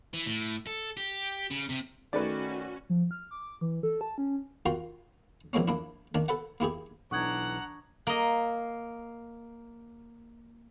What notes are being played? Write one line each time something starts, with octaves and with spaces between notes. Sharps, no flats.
E3
A2
A4
G4
C#3
C3
D#3 A3 C#4 F#4 B4 D5
F3
F6
D6
E3
A4
A5
C#4
F4 F#4 A#4 G5 C6
A#1 E3 G#3 A#3 C4 C#4
A#3 D4 E4
D#3 A#3 D4
A4 B4 F#5
A#3 E4 G4 G#4
B1 E3 D4 F#5 A#5 C#6 D#6 G#6
A#3 D#5